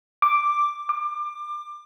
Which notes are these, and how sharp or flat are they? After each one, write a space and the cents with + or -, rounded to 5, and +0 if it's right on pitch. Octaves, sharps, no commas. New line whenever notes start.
D6 +0
D6 +25